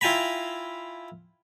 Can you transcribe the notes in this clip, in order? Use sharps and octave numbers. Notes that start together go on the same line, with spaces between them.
E4 F4 G5 G#5 A#5 B5